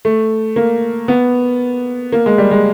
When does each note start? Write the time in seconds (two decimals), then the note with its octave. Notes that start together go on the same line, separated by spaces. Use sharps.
0.05 A3
0.56 A#3
1.08 B3
2.12 A#3
2.26 G#3
2.38 G3
2.51 G#3